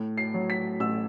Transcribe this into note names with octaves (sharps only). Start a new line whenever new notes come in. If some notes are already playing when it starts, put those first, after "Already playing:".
Already playing: A2
C7
F#3
B6
A1 E6